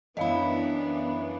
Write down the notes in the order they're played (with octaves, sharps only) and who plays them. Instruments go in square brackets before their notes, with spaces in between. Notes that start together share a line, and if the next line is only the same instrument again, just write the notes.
[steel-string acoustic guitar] F#2 E4 [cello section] E3 B3 D4 [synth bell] D#5 F5 B5